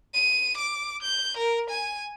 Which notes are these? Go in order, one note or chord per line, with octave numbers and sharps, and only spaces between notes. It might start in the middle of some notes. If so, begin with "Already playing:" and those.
D#7
D6
G6
A#4
G#5